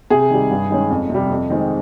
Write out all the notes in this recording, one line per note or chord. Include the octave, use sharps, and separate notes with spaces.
C3 G#4
D#3 G3
G2
D#3 G#3 C#4
F2
C3 G3
F2
D#3 G#3 C4